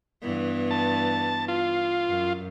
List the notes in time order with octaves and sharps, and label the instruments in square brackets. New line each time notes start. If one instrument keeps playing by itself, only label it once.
[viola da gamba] G2 E3 B3
[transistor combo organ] A5
F4
[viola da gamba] F#2